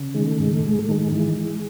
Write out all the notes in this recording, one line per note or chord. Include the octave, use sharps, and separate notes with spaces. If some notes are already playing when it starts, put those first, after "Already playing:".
Already playing: C#3
D#3 G#3
A3
G#2 G#3
A3
G#2 G#3
A3
D#3 G#3
E3 G#3
E3